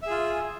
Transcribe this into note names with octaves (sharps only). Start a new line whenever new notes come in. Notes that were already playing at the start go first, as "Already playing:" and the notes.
F4 G#4 E5